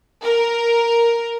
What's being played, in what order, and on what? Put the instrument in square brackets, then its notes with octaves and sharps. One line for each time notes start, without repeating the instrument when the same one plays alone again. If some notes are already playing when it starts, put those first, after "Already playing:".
[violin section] A#4